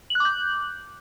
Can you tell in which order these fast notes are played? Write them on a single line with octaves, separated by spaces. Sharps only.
F#7 F#6 D6 G6